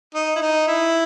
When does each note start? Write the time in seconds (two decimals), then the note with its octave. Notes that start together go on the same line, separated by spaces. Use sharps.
0.14 D#4
0.36 E4
0.42 D#4
0.67 E4